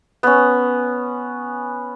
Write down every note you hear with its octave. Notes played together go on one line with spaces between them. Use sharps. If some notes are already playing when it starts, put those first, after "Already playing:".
B3 C#4